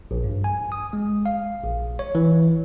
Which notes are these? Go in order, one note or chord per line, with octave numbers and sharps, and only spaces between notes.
A#1
G2
G#5
D#6
G#3
F5
A#1
C#5
E3